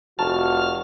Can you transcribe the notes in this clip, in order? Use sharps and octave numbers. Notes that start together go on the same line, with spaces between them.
F1 F#4 A5 F6